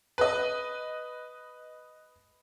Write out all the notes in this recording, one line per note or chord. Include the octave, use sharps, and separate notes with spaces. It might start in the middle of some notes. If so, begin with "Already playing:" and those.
B4 D#5